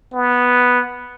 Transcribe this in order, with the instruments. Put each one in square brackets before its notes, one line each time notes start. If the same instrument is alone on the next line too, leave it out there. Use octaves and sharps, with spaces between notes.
[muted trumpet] B3